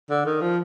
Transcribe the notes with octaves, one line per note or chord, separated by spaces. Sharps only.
D3
D#3
F3